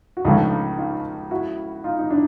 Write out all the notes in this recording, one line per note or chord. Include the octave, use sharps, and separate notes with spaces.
F#4
C#2 C#3 F3 A3 D#4 F4
D#4 F4
E4 F#4
D#4 F4
D#4
D4 E4